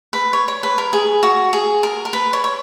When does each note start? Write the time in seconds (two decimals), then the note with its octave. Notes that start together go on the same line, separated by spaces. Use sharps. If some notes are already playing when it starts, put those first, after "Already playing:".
0.13 B4
0.33 C#5
0.48 C#5
0.63 B4
0.78 A#4
0.93 G#4
1.23 F#4
1.53 G#4
1.83 A#4
2.05 A#4
2.13 B4
2.33 C#5
2.44 C#5